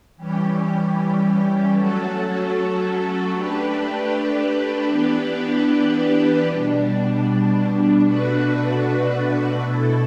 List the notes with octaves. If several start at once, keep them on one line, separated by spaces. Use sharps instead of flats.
E3 G3 C#4 G4
F#3 A3 C#4 F#4 A4
A3 D4 G4 B4
E3 B3 D4 G4 B4
B2 G3 D4
B2 A3 D4 F#4 B4
B2 A3 E4 A4